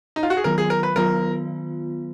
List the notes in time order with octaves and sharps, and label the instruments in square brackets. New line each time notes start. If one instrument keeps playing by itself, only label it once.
[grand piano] D#4
F4
F#4
G#4
[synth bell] D#3 F#3 B3 F4 [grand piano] A#4
[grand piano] G#4
A#4
B4
[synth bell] D#3 F#3 B3 F4 [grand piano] A#4